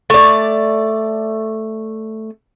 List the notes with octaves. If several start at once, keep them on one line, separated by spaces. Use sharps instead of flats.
A3 D5